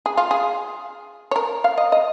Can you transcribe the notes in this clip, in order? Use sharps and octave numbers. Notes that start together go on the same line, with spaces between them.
G#4
F4
G#4
C#5
A#4
F5
D#5
D#5